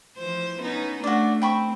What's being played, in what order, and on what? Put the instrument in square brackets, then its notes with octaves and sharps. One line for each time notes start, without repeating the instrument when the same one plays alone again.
[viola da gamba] E3 F3 C5
B3 C#4 D#4
[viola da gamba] A3 D4 [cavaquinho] F#4 D5
[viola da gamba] C4 [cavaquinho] G5 B5 C#6